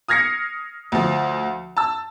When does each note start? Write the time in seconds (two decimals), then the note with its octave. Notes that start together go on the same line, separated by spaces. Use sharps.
0.08 D#6 F6 G#6 A#6 C7 C#7
0.92 D2 F3
1.77 A5 E6